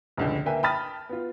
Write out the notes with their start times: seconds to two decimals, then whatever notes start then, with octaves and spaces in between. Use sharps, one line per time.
0.17 F1 C#2 D3
0.46 A#3 B4 E5 G5 G#5
0.63 G5 A5 B5 D#6 F6 A6
1.09 B3 F4